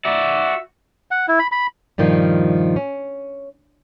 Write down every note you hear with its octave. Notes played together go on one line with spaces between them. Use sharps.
F#4 D5 E5
F#5
E4
B5
B5
G2 A#2 D#3 F3 G3
C#4